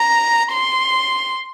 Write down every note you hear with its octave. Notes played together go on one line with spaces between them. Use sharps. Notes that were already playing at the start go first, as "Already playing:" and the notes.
Already playing: A#5
C6